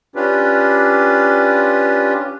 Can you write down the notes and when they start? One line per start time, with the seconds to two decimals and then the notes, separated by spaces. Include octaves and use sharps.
0.16 C#4 D4 F4 G4 B4